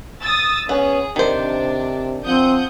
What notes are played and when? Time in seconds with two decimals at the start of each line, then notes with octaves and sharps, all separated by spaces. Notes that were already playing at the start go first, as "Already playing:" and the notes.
0.21 D#6 E6 A6
0.69 B3 C#4 G#4
1.16 C3 D#3 D4 C5
2.23 F3 C4 F#5 D#6 G6